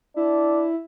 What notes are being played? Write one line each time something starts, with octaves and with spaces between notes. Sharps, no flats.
D4 E4